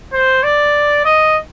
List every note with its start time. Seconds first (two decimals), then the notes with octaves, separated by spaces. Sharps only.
0.13 C5
0.43 D5
1.05 D#5